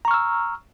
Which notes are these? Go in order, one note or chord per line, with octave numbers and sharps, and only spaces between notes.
A#5 C#6 E6 F6